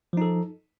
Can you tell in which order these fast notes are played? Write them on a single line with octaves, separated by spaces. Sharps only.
F3 D#4 A4